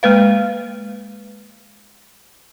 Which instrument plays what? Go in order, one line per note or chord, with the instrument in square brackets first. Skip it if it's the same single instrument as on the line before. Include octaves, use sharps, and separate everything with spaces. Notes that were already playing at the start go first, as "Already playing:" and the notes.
[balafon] G#3 A#3 B4 F5